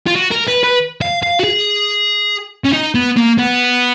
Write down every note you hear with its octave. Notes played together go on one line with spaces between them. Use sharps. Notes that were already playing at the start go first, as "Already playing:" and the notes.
F4
F#4
A#4
B4
B4
F5
F5
F#4
G#4
C#4
D#4
B3
A#3
B3